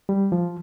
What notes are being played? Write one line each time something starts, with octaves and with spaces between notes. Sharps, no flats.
G3
F3